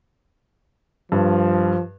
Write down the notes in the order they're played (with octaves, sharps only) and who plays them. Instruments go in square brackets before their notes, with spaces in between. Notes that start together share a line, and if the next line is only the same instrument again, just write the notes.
[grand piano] G2 [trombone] F3